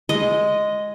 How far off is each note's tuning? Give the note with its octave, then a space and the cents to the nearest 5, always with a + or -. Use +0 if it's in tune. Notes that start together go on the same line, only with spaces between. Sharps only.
G#3 +0 D#5 +0